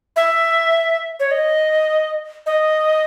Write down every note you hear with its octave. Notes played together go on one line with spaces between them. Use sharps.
E5
C#5
D#5
D#5